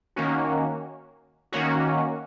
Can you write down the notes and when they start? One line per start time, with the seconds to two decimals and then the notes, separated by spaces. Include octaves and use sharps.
0.16 D#3 A#3 C#4 F#4
1.52 D#3 A#3 C#4 F#4